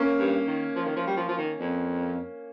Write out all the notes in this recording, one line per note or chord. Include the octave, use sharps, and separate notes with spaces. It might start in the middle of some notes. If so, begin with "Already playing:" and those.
Already playing: A#3 C#4
G2
D#3
F3
D#3
F3
G3
F3
F3
D#3
F2